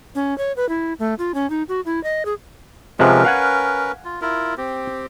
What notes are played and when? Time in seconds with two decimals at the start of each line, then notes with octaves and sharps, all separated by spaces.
0.15 C#4
0.38 C#5
0.57 B4
0.69 E4
0.99 A3
1.19 F4
1.34 C#4
1.50 D#4
1.69 F#4
1.86 E4
2.04 D#5
2.25 G#4
2.99 C3 F3 G#3 C#4 A#4 B4
3.25 F5 F#5 G#5
4.05 F4
4.22 E4 F4 A#4
4.58 C4 G4